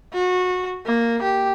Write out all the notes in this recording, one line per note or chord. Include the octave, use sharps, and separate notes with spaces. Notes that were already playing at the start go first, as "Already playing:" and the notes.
F#4
A#3
G4